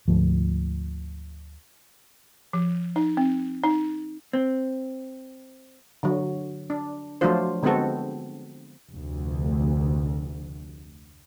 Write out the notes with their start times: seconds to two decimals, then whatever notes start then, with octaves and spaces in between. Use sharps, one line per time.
0.08 D2 G#2 F3 A3
2.53 F3
2.96 D#4
3.17 C4
3.64 D#4
4.33 C4
6.03 D3 F#3
6.70 D4
7.21 F3 F#3 A3 D4 F4 C5
7.63 D3 G#3 B3 C4 F#4 A4
8.91 F1 D2